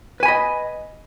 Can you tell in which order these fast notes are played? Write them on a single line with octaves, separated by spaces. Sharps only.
B4 G#5 B5 D#5